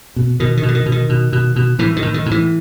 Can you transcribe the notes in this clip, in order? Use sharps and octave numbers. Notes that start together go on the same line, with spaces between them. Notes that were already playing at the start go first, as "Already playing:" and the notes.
B2
B2 D#3
D#3
B2
D3
D#3
B2
D#3
B2
B2
B2
A2 E3
D#3
A2
D#3
A2
E3